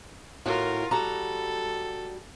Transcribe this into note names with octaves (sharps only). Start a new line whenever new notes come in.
A2 F4 F#4 A#4
G3 F#4 A4 A#5